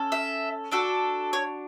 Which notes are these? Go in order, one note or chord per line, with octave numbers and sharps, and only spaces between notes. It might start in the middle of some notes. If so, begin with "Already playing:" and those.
Already playing: C#4 A4
E5
D4 F#4 A4
C#5